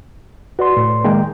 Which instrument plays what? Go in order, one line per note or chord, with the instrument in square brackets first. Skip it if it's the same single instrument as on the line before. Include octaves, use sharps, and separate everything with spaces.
[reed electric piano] F#4 [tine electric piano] B4 D5 C6
[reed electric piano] A2
[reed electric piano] D#3 G#3 A#3 [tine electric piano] G5